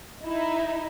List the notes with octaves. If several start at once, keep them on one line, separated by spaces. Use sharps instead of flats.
D#4 E4